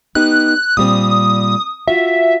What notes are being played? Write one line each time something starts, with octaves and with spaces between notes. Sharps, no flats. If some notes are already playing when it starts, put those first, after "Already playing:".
B3 D#4 G4 F#6
A#2 G3 C4 D#6
F4 F#4 E5